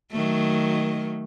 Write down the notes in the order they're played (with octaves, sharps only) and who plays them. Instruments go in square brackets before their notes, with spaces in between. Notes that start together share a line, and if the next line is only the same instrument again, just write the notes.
[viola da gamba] D#3 F#3 A3